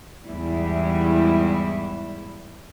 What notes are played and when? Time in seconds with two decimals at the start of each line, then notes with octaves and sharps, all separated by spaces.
0.24 E2 G#2 G3 E4